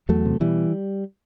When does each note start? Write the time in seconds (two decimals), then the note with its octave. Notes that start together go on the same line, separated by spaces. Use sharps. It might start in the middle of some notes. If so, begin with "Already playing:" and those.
0.09 E2 F#3 A3
0.25 C3
0.40 B2 E3 G3